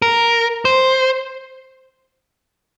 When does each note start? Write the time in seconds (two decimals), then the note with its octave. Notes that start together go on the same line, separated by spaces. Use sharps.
0.02 A#4
0.65 C5